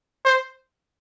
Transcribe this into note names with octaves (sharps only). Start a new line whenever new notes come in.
C5